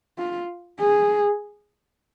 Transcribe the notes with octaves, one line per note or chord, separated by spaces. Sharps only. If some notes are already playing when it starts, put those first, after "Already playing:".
F4
G#4